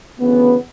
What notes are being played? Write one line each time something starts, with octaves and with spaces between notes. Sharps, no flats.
D2 C#3 E3 B3